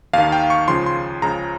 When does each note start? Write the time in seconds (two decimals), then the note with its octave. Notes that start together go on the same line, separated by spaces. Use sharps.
0.13 D#2 D#3 F5
0.32 G5
0.50 C#6
0.68 C#2 C#3 F3 C6
0.86 C6
1.22 C#2 C#3 F3 A#5